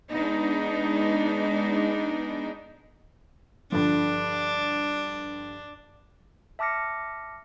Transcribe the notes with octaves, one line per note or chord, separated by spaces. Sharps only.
G#3 B3 D4 D#4
G2 D3 F3 D4
E5 A5 D6 F6 A#6 C#7